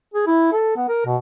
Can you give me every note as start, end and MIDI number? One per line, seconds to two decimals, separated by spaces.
0.14 0.26 68
0.27 0.51 64
0.52 0.75 69
0.76 0.85 59
0.89 1.04 70
1.06 1.16 47